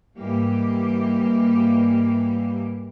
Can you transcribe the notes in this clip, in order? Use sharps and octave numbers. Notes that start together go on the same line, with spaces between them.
G#2 E3 G3 A#3 G4